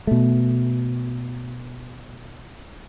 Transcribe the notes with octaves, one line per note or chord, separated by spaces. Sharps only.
B2 A3